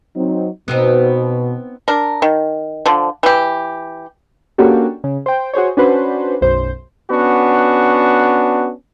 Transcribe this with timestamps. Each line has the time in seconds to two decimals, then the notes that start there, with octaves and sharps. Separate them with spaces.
0.15 F#3 C4 D#4
0.68 B2 B3 C4 D#4
1.88 D4 A#4
2.22 D#3
2.86 D3 F3
3.23 E3 G4
4.58 A#3 C#4 D4 F#4 G4 A4
5.04 C#3
5.26 C5 G5
5.54 F#4 G#4 C5 C#5
5.77 C#4 D4 F#4 B4 C5
6.41 B1 F#2 C5
7.11 B3 C#4 D4 F#4